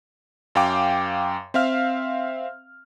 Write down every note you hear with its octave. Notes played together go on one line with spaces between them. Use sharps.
F#2 F5 G5 D6
C4 E5 F5 F6